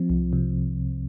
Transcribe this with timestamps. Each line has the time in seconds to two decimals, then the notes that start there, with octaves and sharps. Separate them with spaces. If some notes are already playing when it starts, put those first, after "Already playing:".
Already playing: F3 C4
0.10 C2
0.33 C3